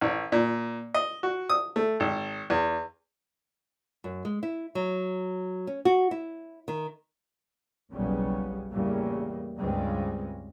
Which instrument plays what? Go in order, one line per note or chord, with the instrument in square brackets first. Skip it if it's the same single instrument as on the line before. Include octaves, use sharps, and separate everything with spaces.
[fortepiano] A1
A#2
D#5
F#4
D#6
A3
G#1
E2
[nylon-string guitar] F#2
G#3
E4
F#3
C#4
F#4
E4
D#3
[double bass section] F#1 B1 C#3 G3 B3 C#4
E2 A2 C#3 G3 A#3
C#2 G2 C#3 G3 G#3 C4